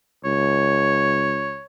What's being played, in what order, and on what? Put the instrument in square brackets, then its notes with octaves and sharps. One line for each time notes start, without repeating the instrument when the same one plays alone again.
[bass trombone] C#2 [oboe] C#5